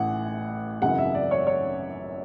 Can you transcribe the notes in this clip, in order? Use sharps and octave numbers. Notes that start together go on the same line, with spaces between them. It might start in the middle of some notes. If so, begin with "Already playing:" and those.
Already playing: A1 A2 E3 F#5
G#1 F#2 C#3 E3 F#5
E5
D5
C#5
C#5